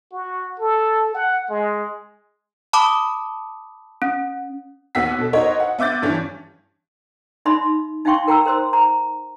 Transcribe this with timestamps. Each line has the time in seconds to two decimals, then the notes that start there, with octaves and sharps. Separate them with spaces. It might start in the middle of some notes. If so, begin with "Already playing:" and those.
0.12 F#4
0.59 A4
1.14 F#5
1.49 G#3
2.73 A5 B5 D6 D#6
4.02 C#4
4.95 D#2 B3 F#4 E6 B6
5.18 B2 A4
5.33 D#4 F#4 A#4 C5 C#5 D#5
5.60 F#5
5.78 B3 E5 D6 G6 A6
6.02 G2 E3 C#4
7.45 D#4 E5 B5 C6
8.05 D#4 E5 F5 G5 C6 C#6
8.27 A#4 G5 A#5 B5 E6
8.46 A#4 C5 C6 E6
8.73 A#5